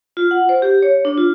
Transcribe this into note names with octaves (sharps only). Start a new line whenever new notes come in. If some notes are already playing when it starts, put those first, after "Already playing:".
F4
F#5
C5
G4
C#5
D4
F4